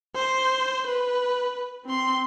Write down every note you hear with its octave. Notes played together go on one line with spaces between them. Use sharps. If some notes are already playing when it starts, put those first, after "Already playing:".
C5
B4
C4 C6